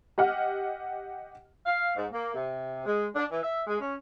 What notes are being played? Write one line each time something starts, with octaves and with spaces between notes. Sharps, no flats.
G4 D#5 F#5 F6
F5
G#2
A#3
C3
G#3
D4
E3
E5
G#3
C#4